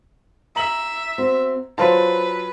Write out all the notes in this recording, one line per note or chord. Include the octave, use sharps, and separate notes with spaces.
E5 A#5 F#7
C4 F#4
F#3 F4 B4 C5 F#5 A5